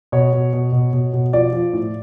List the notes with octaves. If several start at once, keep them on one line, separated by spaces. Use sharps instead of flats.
B2 C#5
B2
B2
B2
B2
B2
F3 D5
F3
A2